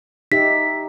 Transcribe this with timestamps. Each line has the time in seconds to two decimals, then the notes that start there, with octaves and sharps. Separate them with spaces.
0.32 D#4 G4 E5 B6